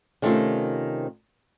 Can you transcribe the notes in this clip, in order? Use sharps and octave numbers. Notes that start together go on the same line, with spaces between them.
C3 D#3 A3 C4 C#4 F4